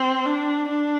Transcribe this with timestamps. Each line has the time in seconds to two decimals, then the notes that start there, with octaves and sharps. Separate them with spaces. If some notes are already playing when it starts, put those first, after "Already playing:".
Already playing: C4
0.26 D4
0.68 D4